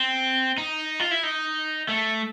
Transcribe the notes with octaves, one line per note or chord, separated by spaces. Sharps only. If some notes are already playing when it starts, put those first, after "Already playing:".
Already playing: C4
D#4
F4
E4
D#4
A3